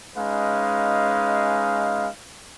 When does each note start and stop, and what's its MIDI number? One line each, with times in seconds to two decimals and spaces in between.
0.16 2.09 56
0.16 2.09 61
0.16 2.09 63
0.16 2.09 71
0.16 2.09 77